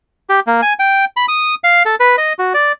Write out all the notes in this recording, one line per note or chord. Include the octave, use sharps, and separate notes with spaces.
G4
A#3
G#5
G5
B5
D#6
F5
A4
B4
D#5
F#4
D5